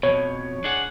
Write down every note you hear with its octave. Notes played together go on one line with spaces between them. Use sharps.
F2 B2 C#5
D4 G#4 F#5